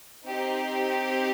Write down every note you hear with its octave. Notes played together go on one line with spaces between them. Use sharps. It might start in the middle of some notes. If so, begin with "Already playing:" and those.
C4 D#4 G4